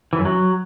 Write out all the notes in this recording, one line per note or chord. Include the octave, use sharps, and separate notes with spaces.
E3
F#2
F#3